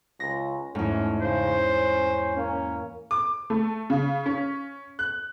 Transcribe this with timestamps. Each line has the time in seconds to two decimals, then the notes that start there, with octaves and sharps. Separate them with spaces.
0.20 C#2 A#6
0.75 E2 G#2 A3 C#4
1.22 C#3 C5
1.59 C#4
2.37 A#3 C#4
3.11 D6
3.50 A3
3.90 C#3
4.26 C#4
4.99 F#6